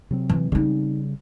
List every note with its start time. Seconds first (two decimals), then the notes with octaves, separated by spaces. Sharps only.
0.11 C3 F#3 C4
0.29 E3
0.52 C#3 G3 C4 D#4